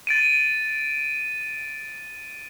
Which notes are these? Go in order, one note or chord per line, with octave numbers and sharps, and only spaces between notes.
A6 D7 D#7